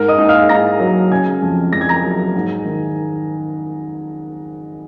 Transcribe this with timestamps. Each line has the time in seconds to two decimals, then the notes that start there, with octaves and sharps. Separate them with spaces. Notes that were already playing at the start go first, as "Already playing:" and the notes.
Already playing: G#2 A#4 A#5
0.08 D#5 D#6
0.18 G#2
0.29 F5 F6
0.49 G#2 A#5 A#6
0.80 F#3
1.11 C#3 G#5 G#6
1.42 F2
1.73 F2 A#6
1.81 G#6
1.89 A#5 A#6
2.04 F#3
2.35 G#2
2.65 D#3